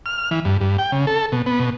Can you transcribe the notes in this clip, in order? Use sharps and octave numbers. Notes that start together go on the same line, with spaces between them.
F6
E3
G2
G2
G5
C#3
A4
B2
B3
B2